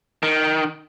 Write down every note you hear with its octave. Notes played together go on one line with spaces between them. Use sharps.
D#3